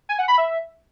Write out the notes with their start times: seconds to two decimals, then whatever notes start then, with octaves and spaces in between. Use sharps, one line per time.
0.09 G#5
0.18 F#5
0.28 B5
0.38 E5